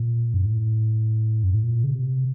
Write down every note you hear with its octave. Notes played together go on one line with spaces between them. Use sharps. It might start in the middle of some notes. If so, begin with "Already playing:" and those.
Already playing: A#2
F#2
A2
F#2
A2
A#2
C#3
C3